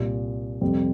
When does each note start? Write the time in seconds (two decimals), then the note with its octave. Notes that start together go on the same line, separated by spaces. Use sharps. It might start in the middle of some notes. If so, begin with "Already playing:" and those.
Already playing: C2 A#2 G3
0.61 F2 C3 G3 C4